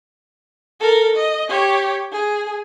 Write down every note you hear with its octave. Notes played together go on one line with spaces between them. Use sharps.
A4 A#4
D#5
G4 C#5
G#4